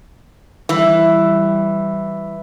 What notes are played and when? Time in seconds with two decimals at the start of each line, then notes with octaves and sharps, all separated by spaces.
0.69 E3 G3